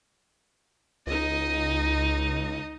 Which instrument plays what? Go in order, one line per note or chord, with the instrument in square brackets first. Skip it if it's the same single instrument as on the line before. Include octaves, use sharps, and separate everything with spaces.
[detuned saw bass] C#2 [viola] D#4 D#5